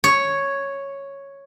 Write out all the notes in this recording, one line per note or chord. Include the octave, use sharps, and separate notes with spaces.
C#5